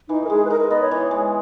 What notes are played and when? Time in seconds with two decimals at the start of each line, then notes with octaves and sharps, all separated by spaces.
0.09 E3 D#4
0.24 A#4
0.29 G#3 G#4
0.45 B4
0.50 D#4 A#4
0.60 A#4
0.70 B3 D#5
0.81 C#5
0.91 E3
1.11 G#3